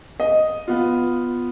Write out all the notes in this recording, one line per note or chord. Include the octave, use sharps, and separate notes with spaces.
D#5
B3 F4